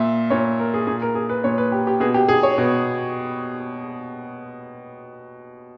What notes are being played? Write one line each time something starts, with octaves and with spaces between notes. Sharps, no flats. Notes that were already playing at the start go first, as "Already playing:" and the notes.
Already playing: A#2 E5
A#2 C#5
A#4
G#4
A#2 G#4
A#4
G#4
B4
A#2 C#5
B4
G4
G4
B2 G#4
G4
G#4
C#5
B2